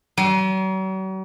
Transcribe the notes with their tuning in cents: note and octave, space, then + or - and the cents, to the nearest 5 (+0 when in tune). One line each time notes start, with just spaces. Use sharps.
F#3 +45